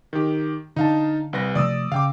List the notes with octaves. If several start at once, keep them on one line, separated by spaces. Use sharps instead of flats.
D#3 G4
D3 D#4 F5 A5
C2 B4 A#6
C3 F3 A3 D5 D#6 E6
C#3 F5 G5 D6